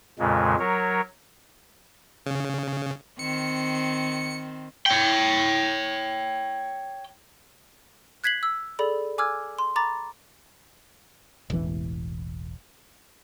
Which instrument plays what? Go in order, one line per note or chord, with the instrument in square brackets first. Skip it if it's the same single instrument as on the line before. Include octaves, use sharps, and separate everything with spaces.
[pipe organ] F2 A#2 C#3 G#3
F#3 A#4 C#5
[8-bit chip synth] C#3
[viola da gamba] D#3 C4 [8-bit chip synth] C#7
[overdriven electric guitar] C#5 G5
[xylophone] F#6 G#6 B6 C7 F#7
E6
G#4 A4 D5 B5
G#5 D6 E6 F6 G#6
C6
A#5 B5 D6 A6
[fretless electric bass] E1 A1 E3